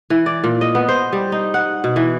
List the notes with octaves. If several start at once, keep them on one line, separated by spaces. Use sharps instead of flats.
E3
D5
A#2
D#5
B3
C5
G3
D#4
F#5
B2
E3